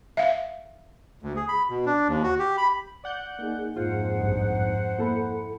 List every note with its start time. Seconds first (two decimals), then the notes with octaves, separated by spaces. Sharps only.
0.17 E5 F5
1.23 D2
1.36 G#4
1.48 B5
1.69 B2
1.86 D4
2.08 D#2
2.23 F#4
2.39 G4
2.58 B5
3.04 D5 F#5 G6
3.39 A#3 D#4 G#4
3.76 F2 G#2 F4 C5 F#5
4.21 A#1 G2
4.98 A#3 E4 A4 B5